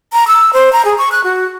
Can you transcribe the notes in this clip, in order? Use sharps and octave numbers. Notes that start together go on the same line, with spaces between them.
A#5
E6
C5
A#5
G#4
C#6
F#6
F#4